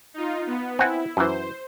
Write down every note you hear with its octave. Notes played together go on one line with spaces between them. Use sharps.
D#4 F4
B3
C4 E4 F#5 G#5
F#2 E3 C5